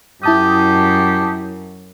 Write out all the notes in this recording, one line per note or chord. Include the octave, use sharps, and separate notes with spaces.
F#2 E4 G4 A5 D#6